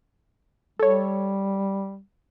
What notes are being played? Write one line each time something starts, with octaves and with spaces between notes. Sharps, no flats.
G3 A4 C#5